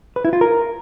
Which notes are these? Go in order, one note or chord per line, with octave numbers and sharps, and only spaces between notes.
B4
E4
F4
A#4